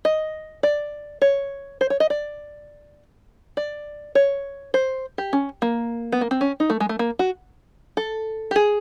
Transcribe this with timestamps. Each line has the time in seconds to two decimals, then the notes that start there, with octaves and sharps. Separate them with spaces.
0.05 D#5
0.63 D5
1.22 C#5
1.81 C5
1.90 C#5
2.00 D#5
2.10 D5
3.57 D5
4.15 C#5
4.74 C5
5.18 G4
5.33 C#4
5.62 A#3
6.12 B3
6.21 A#3
6.31 C4
6.41 C#4
6.60 D#4
6.70 A3
6.80 G#3
6.89 A3
6.99 A#3
7.19 F#4
7.97 A4
8.51 G4
8.56 G#4